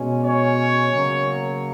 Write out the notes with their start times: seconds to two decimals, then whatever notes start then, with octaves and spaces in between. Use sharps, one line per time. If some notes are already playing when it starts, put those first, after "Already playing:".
Already playing: B2 G#3 C#4
0.24 C#5
0.90 C#3 F#3 A#3